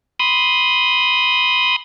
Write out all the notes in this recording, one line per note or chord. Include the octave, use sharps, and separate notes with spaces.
B5 C6 D#6